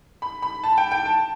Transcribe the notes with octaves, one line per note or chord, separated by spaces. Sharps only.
B5
B5
A5
G5
G5
A5